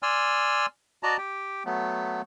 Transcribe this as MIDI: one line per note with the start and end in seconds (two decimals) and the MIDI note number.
0.03 0.66 74
0.03 0.66 80
0.03 0.66 84
0.03 0.66 88
0.03 0.66 89
1.03 1.17 66
1.03 1.17 74
1.03 1.17 75
1.03 1.17 81
1.03 1.17 82
1.18 1.63 67
1.18 1.63 79
1.65 2.22 54
1.65 2.22 57
1.65 2.22 59